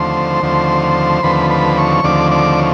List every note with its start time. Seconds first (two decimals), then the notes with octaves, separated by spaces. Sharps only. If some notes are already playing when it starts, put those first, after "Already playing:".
Already playing: D#2 D3 F3 A3 C4 C5 C6
0.42 D#2 D3 F3 A3 C4
1.23 D#2 D3 F3 A3 C4 B4 B5
1.50 B4 B5
1.77 C#5 C#6
2.04 D#2 D3 F3 A3 C4 D5 D6
2.31 D5 D6
2.58 C#5